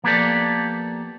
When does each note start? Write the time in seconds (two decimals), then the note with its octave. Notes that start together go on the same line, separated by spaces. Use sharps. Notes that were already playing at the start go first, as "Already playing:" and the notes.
0.04 F3 A#3 B3 G4 A4 D5